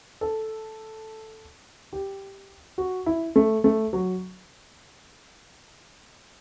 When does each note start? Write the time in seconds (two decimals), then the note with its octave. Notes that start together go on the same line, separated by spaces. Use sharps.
0.21 A4
1.93 G4
2.78 F#4
3.06 E4
3.36 A3
3.64 A3
3.93 F#3